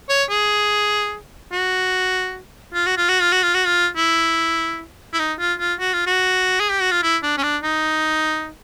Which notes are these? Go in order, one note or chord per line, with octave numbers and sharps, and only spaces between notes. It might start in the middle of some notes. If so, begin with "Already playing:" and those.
C#5
G#4
F#4
F4
F#4
F4
F#4
F4
F#4
F4
F#4
F4
E4
E4
D#4
F4
F4
F#4
F4
F#4
G#4
G4
F#4
F4
E4
D4
C#4
D4
D#4